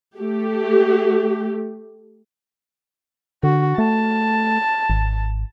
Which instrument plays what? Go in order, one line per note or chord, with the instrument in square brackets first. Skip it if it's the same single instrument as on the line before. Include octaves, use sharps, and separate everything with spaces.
[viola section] A3 G4
[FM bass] D3 [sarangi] F#4
[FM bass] A3 [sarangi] A5
[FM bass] G#1